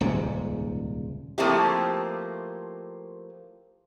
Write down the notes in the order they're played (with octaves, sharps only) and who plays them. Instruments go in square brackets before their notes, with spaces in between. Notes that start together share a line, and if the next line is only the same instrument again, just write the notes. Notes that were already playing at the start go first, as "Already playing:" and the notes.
[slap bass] D#1 C#2 G#2 C3
[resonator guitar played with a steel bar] F3 A3 A#3 C4 E4 G4